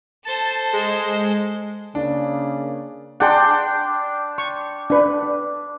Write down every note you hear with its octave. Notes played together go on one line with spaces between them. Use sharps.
A4 C5 A5
G#3
C#3 A#3 D4
D4 G#4 F#5 G5 C6
C#6
D4 B4